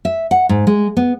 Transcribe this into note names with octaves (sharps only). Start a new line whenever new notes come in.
E5
F#5
G#2
G#3
B3